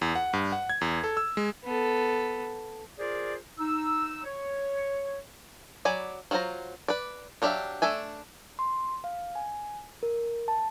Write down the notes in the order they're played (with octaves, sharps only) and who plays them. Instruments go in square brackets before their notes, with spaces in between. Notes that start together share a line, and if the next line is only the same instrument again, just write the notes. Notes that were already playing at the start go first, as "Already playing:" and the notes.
[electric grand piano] E2
F#5
G2
F#5
G#6
E2
A4
E6
G#3
[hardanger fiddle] B3 A4
[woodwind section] F4 G#4 A#4 C5 D5
D#4 E6
C#5
[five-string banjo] F#3 D5 G#5 B5
F#3 C#4 F4 C5 A#5
B4 D5
F#3 D4 G4 E5 F5
A3 D4 E5 G#5
[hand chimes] C6
F5
G#5
A#4
A5